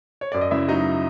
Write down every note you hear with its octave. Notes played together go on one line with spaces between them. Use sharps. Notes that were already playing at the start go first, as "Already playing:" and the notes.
C#5
F#2 D5
D#5
C#3 E4 E5
F#3 D#4 D#5